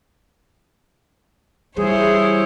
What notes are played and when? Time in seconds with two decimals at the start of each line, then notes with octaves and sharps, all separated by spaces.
1.77 E3 G3 E4 G#4 C5 C#5